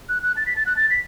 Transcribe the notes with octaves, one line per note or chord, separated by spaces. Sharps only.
F#6
F#6
A6
B6
A6
F#6
A6
B6